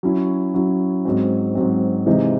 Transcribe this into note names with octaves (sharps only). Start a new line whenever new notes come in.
F#3 C#4 E4
F#3 C#4 E4
G#2 F#3 C4
G#2 F#3 C4
C3 E3 G#3 D#4